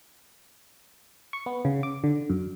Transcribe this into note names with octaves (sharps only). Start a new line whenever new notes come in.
C#6
B3
C#3
D6
D3
F#2